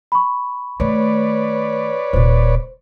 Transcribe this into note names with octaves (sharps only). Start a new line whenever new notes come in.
B5 C#6
D#3 A3 B4 C#5 D5
D#1 A#2 C5